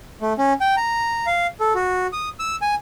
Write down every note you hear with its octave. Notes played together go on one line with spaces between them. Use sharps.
A3
C#4
G5
A#5
F5
A4
F#4
D#6
E6
G#5